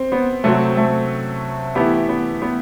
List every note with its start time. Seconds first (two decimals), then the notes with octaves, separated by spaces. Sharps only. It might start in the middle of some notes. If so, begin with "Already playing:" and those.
Already playing: C4
0.12 B3
0.44 C3 F#3 A3 C4 F#4
0.77 A3
1.75 E3 A3 B3 E4 G4
2.09 B3
2.42 B3